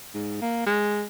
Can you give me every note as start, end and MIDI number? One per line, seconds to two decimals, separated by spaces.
0.14 0.39 44
0.41 0.61 58
0.66 1.03 56